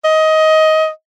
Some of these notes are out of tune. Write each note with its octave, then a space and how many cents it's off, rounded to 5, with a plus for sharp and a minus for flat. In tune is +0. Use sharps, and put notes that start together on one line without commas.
D#5 +15